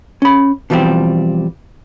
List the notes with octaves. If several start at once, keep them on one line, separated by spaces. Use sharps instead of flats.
C#4 B5
B2 E3 F3 G3 C4 G4